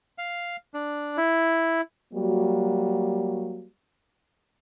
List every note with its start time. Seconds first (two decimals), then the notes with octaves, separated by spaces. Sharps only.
0.18 F5
0.74 D4
1.17 E4
2.13 F#3 G3 A#3 F#4